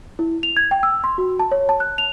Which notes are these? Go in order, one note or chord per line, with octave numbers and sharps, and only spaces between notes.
E4
F7
G#6
G5
E6
C6
F#4
A5
C#5
A5
F#6
F7